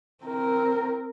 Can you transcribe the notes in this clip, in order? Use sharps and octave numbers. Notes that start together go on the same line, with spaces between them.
C4 A#4